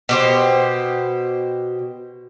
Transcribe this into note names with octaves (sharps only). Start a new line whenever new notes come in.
B2 G4 C5